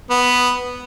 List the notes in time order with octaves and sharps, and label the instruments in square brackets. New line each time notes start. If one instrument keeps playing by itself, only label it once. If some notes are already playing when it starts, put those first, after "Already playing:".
[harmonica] B3